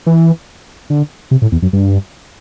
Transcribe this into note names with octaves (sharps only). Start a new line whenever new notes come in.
E3
D3
C3
A2
E2
F#2
G2